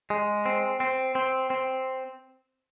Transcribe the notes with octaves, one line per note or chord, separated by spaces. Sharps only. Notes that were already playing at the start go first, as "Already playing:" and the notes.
G#3
C4
C4
C4
C4